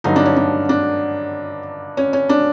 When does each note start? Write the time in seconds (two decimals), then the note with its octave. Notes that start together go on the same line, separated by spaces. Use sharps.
0.04 G2 D3 F#3 D#4
0.16 D4
0.25 C#4
0.36 D4
0.69 D4
1.97 C#4
2.13 C#4
2.29 D4